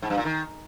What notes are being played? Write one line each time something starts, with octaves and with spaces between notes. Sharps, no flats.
G#2
G2
A#2
D#3